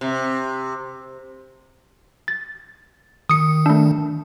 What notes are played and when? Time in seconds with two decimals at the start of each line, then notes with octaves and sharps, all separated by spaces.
0.01 C3
2.28 A6
3.29 D#3 D#6 C#7
3.66 A3 D4